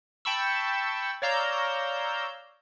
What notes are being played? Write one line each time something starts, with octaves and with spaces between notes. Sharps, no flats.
G5 A5 B5 C#6 E6
C#5 D5 F5 A#5 E6 G6